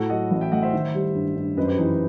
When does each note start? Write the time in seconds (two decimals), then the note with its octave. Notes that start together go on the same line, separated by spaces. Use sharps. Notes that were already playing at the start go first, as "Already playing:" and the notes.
Already playing: A2 F#4 A4
0.09 F#3 D#5 F#5
0.31 A1
0.41 E5 G5
0.52 A3 D#5 F#5
0.62 C5 E5
0.73 D#3
0.94 G3
1.15 G2
1.36 G2
1.57 F#2 B4 D#5
1.63 C5
1.68 G4 B4
1.78 E3 D#4